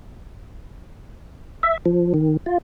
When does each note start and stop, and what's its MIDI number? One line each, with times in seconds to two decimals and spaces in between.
1.63 1.77 76
1.86 2.13 53
2.14 2.37 51
2.46 2.58 65